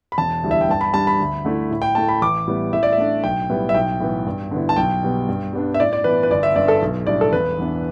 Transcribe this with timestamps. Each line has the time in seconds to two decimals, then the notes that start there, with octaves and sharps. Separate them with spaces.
0.12 B5
0.18 E1 A5
0.43 D2 D3 G3 E4
0.51 E5
0.61 G5
0.69 G2 A5
0.81 B5
0.94 G3 D4 A5
1.07 B5
1.19 D2
1.45 D3 A3 E4
1.71 A2
1.82 G5
1.95 A3 E4 A5
2.09 B5
2.22 A1 D6
2.47 A2 G3 B3
2.73 A2 E5
2.83 D5
2.93 E5
2.98 A3 D4
3.24 B1 G5
3.49 A2 G3 B3 E4
3.69 E5
3.74 B1 G5
4.00 A2 E3 B3
4.26 G2
4.51 D3 B3 E4
4.69 A5
4.77 B1 G5
5.03 B2 G3 B3
5.29 G2
5.53 G3 B3 D4
5.74 E5
5.80 A2 D5
5.93 D5
6.04 E3 B3 B4
6.23 B4
6.30 G1 D5
6.43 E5
6.56 G2 D3 D5
6.68 A4
6.82 B1
7.07 A2 G3 D4 D5
7.21 A4
7.32 E1 B4
7.58 E2 E3 B3 D4